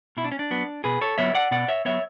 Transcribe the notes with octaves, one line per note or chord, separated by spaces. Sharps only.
B2 E4
D4
C#4
D4
F#3 B3
B2 G#4 B4
A4 C#5
F#3 B3 C#5 E5
D5 F#5
B2 D5 F#5
C#5 E5
F#3 B3 C#5 E5